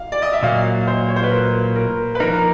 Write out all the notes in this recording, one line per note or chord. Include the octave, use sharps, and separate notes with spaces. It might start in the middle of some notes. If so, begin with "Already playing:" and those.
Already playing: F5
D5
D#5
E5
A#2 F#3 A#3 F5
C5
C#5
C5
B4
A#4
A#4
B4
F3 A#3 D#4 A#4